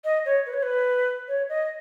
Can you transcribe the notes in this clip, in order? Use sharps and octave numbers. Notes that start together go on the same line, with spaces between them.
D#5
C#5
B4
C#5
B4
C#5
D#5